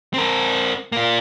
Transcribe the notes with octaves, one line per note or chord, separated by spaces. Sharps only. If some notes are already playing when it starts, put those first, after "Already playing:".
C4 A#4
A#3 F4